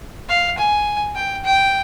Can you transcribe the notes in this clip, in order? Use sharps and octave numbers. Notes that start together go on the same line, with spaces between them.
F5
G#5
G5
G5